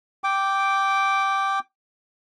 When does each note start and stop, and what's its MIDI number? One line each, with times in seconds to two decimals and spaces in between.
0.24 1.59 79
0.24 1.59 86